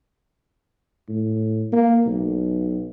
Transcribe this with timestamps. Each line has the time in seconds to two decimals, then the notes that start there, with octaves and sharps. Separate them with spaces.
1.09 A2
1.73 A#3
2.06 B1